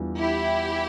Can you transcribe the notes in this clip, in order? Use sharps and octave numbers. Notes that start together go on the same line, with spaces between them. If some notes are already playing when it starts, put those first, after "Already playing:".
Already playing: E2 E3 G3 D4 F4
E4 G4